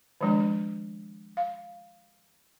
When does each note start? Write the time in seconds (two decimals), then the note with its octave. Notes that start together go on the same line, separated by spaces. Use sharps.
0.21 D#3 F3 G#3 D4
1.37 F5